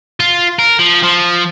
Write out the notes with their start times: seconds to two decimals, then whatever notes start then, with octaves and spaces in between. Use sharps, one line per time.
0.20 F4
0.59 A#4
0.79 F3
1.03 F3